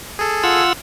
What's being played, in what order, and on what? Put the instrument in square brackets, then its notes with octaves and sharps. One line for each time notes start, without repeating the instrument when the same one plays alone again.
[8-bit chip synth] G#4 A4
[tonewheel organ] F4 F#5 E6